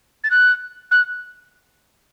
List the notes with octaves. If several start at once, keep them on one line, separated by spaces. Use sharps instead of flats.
A6
F#6
F#6